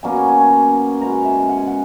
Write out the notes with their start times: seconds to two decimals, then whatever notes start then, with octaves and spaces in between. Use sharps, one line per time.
0.03 B2 F#3 A#3 C#4 G#5
0.16 G#5
0.28 G#5
0.40 G#5
0.52 A#5
1.00 B2 G#3 C#4 A#5
1.13 F#5
1.24 E5
1.37 D#5
1.49 F#5
1.58 G#5
1.67 F#5